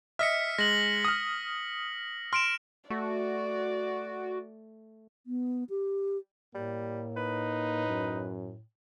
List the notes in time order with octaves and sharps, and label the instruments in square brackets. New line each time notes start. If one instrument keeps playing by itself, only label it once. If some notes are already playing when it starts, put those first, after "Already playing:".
[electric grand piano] D#5 E5 [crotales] F6 B6 C#7
[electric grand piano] G#3 [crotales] A#6 F#7
[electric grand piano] D#6 F6
[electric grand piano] C6 [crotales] F6 D7 E7
[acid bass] A3 [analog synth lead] F#4 [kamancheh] D5
[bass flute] B3
G4
[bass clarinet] A2 [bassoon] G3 [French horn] A#3
[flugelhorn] D#4 [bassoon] B4
[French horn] F#2